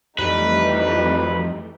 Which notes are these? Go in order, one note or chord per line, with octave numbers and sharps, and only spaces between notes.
F2 E3 G3 A3 D#4 B4